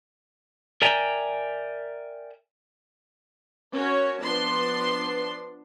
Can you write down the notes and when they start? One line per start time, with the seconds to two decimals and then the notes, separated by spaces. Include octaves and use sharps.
0.82 A#4 D5 E5 G5 G#5 A#5
3.74 C#4 F#4 A#4 C#5
4.21 F3 B3 D4 B4 A5 C6